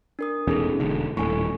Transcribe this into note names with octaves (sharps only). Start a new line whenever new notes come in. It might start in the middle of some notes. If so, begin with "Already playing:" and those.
D4 A#4 D#6
E1 E2 C#4 D#4 G#4 A4
E1 D3
D#1 A2 A4 G#5 C#6